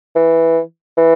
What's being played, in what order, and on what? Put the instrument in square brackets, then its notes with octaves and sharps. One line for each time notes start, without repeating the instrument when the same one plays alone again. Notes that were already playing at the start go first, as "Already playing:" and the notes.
[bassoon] E3
E3